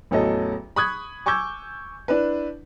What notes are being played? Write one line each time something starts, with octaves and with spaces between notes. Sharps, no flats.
A1 E2 F#3 A4 D#5
B5 C#6 D#6 F#6 G#6
G#5 C#6 D6 E6 G6 G#6
D4 E4 B4